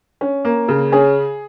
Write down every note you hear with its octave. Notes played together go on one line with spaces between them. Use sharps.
C#4
A#3
C#3
C#4 G#4